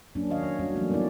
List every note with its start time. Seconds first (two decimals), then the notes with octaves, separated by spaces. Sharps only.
0.15 F#3 A#3 C#4 D4
0.30 D#3 C#5 D#5 F5
0.43 C#5
0.59 G3 C#4 D4 F#4
0.75 E3 F#3 A3 A#3 D4
0.90 G3 B3 D#4 E4 C#5 D5